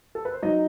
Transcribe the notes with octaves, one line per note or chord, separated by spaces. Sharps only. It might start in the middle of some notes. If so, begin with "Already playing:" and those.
A4
B4
C5
F#3 D#4 D#5